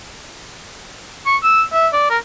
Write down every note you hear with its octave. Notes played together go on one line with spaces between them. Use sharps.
C#6
E6
E5
D5
A#4